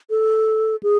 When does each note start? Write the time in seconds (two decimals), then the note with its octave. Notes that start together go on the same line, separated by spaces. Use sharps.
0.10 A4
0.83 G#4